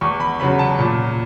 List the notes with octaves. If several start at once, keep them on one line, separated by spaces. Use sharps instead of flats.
E2 C#6
B5
C#3 F#3 B5
A5
A#2